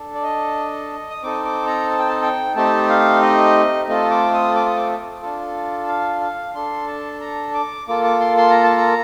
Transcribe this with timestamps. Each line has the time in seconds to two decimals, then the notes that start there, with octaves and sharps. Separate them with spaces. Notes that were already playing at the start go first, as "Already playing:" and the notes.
Already playing: D4 A4
0.15 D5
0.23 D#5
1.10 D#6
1.22 C4 D#4 A4 D6
1.45 D6
1.67 A#5
1.90 A5
1.99 G5
2.09 A5
2.22 G5
2.56 A3 C4 D#4 G4 A5
2.89 F5
3.22 D#5
3.88 A3 C4 F4 A4 D#5
4.11 D6
4.33 D#6
4.56 D6
4.66 D#6
4.77 D6
5.22 D4 F4 A4
5.88 F5
6.21 F5
6.55 D4 A4 C6
6.88 A5
7.21 A#5
7.54 D6
7.88 A#3 F4 A4 D6
8.04 D6
8.20 C6
8.38 C6
8.50 A#5
8.64 A5
8.77 A#5